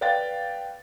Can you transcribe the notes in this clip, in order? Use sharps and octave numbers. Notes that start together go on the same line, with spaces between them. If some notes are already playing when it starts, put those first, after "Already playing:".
B4 D5 F5 G5 A6